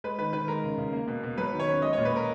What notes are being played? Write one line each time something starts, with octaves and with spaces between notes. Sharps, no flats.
G#3 B4
D#3 B4
D#3 B4
G#3 A#4
C#3
C#3
A#3
B2
B2
F#3 B4
D#3
C#5
C#4
G#3 D#5
C#5
A#2
B4
A#2 A#4